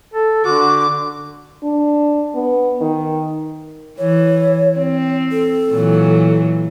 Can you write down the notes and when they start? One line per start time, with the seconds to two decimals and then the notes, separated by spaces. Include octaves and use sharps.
0.14 A4
0.45 D3 F#4 D6
1.63 D4
2.35 B3
2.81 D#3
3.98 E3 C#5
4.79 C4
5.31 A4
5.71 A#2 E3 F#3